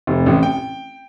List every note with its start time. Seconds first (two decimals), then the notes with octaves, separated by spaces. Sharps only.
0.07 F1
0.26 A1
0.43 G5